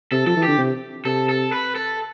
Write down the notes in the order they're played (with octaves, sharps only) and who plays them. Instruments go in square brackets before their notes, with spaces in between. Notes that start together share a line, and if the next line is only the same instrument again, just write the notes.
[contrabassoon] C3 [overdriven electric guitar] A4
[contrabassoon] F3 [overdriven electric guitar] A4
[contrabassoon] E3
[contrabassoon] D3 [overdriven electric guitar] G4
[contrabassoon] C3
[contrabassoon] C3 [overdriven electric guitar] A4
[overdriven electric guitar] A4
B4
A4